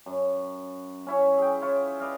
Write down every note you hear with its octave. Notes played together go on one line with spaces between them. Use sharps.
F#2
C#4 E4 C#5
G#4 G5
E4 F4 C#5
B4 D5 D#5 F5